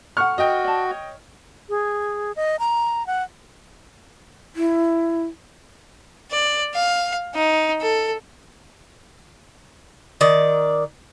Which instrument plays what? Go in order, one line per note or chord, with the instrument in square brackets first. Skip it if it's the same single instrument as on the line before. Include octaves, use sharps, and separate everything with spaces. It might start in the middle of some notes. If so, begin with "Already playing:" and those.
[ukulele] A4 F#5 [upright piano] C#6 F6
[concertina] F#4 [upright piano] D#5 G5
[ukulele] D5 A5
C#5
[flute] G#4
D#5
A#5
F#5
[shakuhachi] E4
[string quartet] D5
F5
D#4
A4
[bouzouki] D#3 D5